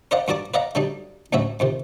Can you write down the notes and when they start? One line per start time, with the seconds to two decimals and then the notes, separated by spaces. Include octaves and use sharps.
0.11 A#4 C5 D5 D#5 F5 F#5
0.28 G2 F#4 A#4 D5 A5 D6
0.54 B4 D5 D#5 F5 F#5 A#5
0.75 D3 F#3 G3 D4 D#4
1.33 D2 A2 F#3 C#4 F#4 E5
1.60 F2 C3 D#3